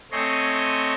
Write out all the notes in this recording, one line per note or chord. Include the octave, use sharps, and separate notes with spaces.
A3 C4 C#5 D#5 G#5 C6